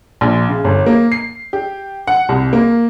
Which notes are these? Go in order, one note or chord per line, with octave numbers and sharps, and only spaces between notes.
A#1
C#3
G1
A#3
C7
G4
F#5
C2
A#3